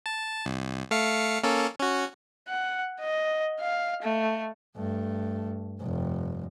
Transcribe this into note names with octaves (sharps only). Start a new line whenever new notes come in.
A5
C2
A3 F5 C#7
A#3 C#4 A4
C#4 F#4
F#5
D#5
F5
A3
G2 A3
F1 G2